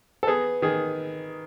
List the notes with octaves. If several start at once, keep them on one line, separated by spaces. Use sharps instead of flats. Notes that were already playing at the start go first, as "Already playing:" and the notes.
A4
B3 G#4
D#3 G#4